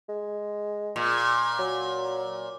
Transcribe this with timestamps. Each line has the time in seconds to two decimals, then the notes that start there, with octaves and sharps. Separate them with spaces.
0.09 G#3
0.96 A#2
1.59 F#3